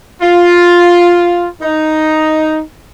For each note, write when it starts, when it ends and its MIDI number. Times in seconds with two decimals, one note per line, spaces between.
0.22 1.47 65
1.61 2.61 63